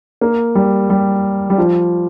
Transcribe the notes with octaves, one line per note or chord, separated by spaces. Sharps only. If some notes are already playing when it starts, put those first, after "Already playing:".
A#3
G3
G3
G3
F3